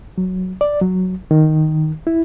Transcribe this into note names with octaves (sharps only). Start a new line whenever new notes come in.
F#3
D5
F#3
D#3
E4